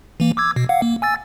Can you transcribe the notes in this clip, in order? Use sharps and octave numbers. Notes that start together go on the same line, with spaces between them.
E3 A#3
D6 E6 G#6
B2
F5 F#5
A#3
G#5 E6 A6